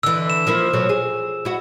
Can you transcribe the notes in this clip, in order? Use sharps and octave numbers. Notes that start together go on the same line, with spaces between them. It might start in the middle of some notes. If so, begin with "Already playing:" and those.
D3 E3 E6
E7
F3 A#3 E4
B2 F#3 A3
G#4
E4 F#4